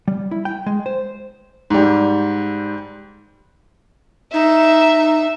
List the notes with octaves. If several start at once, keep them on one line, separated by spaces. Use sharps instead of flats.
G3
E4
G5
G#3
C5
G#2 G3
D#4 E5